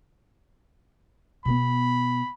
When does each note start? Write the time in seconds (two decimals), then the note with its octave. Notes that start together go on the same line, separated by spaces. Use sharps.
1.45 B2 B3 B5